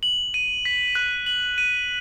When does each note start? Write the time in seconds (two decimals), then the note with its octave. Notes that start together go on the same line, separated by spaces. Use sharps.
0.03 F#7
0.34 D#7
0.65 B6
0.95 F#6
1.26 F#7
1.58 D#7